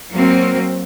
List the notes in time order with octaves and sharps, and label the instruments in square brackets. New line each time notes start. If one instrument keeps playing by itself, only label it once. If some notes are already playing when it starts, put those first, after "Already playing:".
[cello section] F#3 A#3 C4